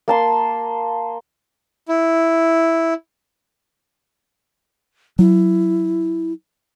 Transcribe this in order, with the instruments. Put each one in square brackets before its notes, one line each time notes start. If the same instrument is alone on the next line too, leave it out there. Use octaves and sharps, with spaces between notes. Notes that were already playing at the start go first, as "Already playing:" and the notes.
[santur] A#3 A5 C6
[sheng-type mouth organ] E4
[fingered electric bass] F#3 [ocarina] E4